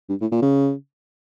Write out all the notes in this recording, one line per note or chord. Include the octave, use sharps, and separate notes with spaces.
G2
A2
A#2
C#3